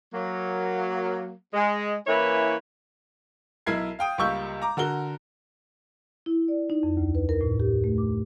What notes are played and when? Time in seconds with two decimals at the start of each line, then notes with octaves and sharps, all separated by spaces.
0.13 F#3 A#3
1.53 G#3
2.07 E3 A#3 C#4 E4 B4 C#5
3.66 B1 E4 A#4 E5 G#6 C7
3.99 F5 G5 D#6
4.18 C#2 G3 A#3 C#6 E6 G6
4.62 A#5 D6
4.77 D3 F#4 A#4 G7
6.26 E4
6.48 D5
6.70 D#4
6.83 F2
6.97 D2
7.15 B4
7.29 A#4
7.41 A2
7.60 G4
7.84 A3
7.98 D6